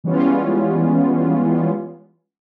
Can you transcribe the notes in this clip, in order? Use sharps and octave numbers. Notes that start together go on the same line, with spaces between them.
E3 G3 G#3 B3 C#4 F4